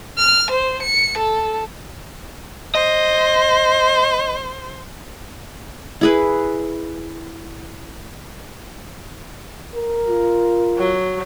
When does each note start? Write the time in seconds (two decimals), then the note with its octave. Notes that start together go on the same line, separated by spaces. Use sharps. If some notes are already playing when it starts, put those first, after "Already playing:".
0.19 F6
0.51 C5
0.82 C#7
1.18 A4
2.75 C5 D#5
6.01 E4 G#4 B4
9.75 A#4
10.06 F4
10.78 F#3